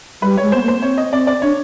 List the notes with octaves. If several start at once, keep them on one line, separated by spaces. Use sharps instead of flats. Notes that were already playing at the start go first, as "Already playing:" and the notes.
G3 B4
C#5
G#3
B3 C5
A#3
C5
B3
C4 C#5
D#5
C4 D5
D5
D4 C#5